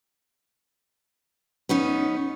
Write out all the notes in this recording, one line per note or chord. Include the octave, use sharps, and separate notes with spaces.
B3 C#4 D#4